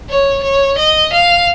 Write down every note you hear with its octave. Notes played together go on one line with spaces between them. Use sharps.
C#5
C#5
D#5
F5